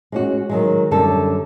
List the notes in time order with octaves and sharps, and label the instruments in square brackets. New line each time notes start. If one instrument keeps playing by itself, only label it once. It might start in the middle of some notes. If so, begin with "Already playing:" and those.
[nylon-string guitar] G#3 C#4 F#4
D#3 F#3 G#3
F#2 D3 G3 A4